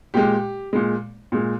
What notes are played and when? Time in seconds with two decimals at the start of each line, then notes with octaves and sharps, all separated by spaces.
0.14 A#2 G#3 G4
0.73 A#2 G#3
1.32 A#2 G#3